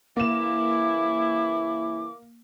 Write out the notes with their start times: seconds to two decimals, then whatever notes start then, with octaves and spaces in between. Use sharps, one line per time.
0.17 C#3 E3 A#3 E4 D6 E7